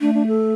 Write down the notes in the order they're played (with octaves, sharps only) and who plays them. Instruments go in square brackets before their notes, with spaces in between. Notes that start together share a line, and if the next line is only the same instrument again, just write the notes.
[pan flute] A3 [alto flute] D4
[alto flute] D4
A4